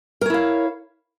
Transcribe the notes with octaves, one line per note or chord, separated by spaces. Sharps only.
E4 A#4 C#5 F5